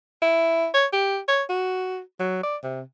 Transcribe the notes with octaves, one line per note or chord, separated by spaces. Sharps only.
E4
C#5
G4
C#5
F#4
F#3
D5
C3